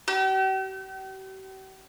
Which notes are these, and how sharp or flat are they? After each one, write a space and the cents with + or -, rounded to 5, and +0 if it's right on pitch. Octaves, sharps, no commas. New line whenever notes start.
G4 -45